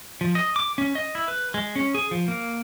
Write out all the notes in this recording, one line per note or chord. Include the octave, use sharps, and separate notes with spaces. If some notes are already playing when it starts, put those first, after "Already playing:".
F3
D#5
D6
C#4
D#5
E4
B4
G#3
C#4
G#4
F3
A#3